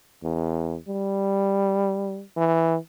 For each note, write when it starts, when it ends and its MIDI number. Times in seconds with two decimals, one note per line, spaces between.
0.23 0.77 40
0.88 2.21 55
2.37 2.76 52